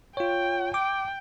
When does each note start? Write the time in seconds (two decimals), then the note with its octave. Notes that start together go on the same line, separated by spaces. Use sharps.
0.17 F4 C#5 G5
0.74 G5 D6